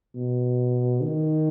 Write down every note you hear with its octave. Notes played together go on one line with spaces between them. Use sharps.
B2
D#3